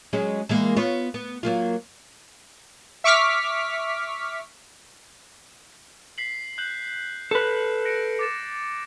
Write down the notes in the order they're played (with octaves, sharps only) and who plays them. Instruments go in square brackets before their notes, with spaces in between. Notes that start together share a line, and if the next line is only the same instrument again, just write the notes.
[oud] F#3 G#3 C#4
E3 G#3 A#3
B3 F4 C#5
B3
F#3 A#3 F4
[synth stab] E5 C#6 D6 F6 B6
[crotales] B6 C7 F#7
F#6 G6 F#7
[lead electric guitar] A4 B4
[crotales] A#6 C#7 D7
D6 A6 E7